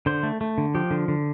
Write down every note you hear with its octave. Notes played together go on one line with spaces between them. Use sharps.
D3 C5
A3
A3
D3
F3 G4
D3
D3